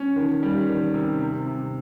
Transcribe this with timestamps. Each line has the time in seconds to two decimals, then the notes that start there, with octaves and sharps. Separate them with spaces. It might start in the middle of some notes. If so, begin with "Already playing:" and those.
Already playing: C#4
0.16 D#3
0.43 G3
0.68 D#3
0.94 C3
1.21 C3
1.47 C3